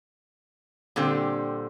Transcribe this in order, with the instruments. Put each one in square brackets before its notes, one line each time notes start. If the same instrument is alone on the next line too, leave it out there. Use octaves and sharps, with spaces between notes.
[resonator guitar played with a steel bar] A#2 D3 G3 C4